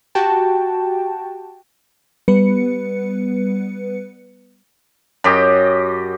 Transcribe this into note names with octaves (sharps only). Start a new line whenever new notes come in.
F#4 G4 G5 A5
G3 B3 B4 C#7
F#2 G4 D#5